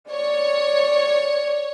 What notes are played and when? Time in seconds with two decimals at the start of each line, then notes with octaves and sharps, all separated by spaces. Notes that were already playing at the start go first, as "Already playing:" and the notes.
0.11 C#5 D5